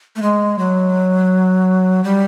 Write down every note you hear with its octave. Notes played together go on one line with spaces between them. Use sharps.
A3
G#3
F#3
G3